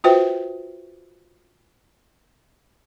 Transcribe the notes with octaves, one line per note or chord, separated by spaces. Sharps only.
F4 F#4 B4 C5 E5 G5